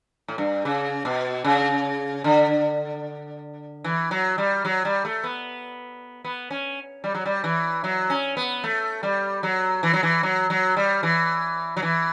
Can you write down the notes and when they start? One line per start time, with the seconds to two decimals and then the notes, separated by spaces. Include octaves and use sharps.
0.28 A2
0.38 G2
0.65 C#3
1.05 B2
1.45 C#3
2.24 D3
3.84 E3
4.11 F#3
4.38 G3
4.65 F#3
4.85 G3
5.05 A3
5.24 B3
6.24 B3
6.51 C#4
7.04 G3
7.15 F#3
7.25 G3
7.44 E3
7.84 F#3
8.10 C#4
8.37 B3
8.64 A3
9.03 G3
9.43 F#3
9.83 E3
9.93 F#3
10.03 E3
10.23 F#3
10.50 F#3
10.77 G3
11.03 E3
11.77 F#3
11.82 E3